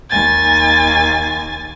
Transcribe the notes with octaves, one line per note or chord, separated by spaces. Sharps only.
D#2 G#5 A6